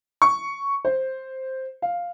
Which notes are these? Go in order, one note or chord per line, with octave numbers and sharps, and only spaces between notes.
C#6
C5
F5